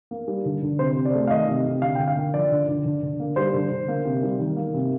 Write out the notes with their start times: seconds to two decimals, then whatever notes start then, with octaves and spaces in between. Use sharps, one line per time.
0.11 A#3
0.28 G3
0.45 D3
0.62 D3
0.79 C3 C5
0.97 C3
1.05 D5
1.15 A3
1.27 F5
1.30 D#3 D#5
1.48 C3
1.66 C3
1.82 D3 F5
1.95 G5
1.99 D3
2.08 F5
2.16 A#3
2.34 F3 D5
2.52 D3
2.68 D3
2.85 D3
3.03 D3
3.20 A#3
3.36 G3 C5
3.54 D3
3.71 D3
3.88 A#3
4.05 C3
4.23 G3
4.40 D#3
4.56 A#3
4.74 C3